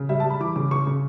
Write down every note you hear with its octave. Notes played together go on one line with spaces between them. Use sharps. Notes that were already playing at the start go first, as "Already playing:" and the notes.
Already playing: C#3
G3 E5
G3 A5
B5
E3 D6
C#3 D6
C#3 C#6
C#3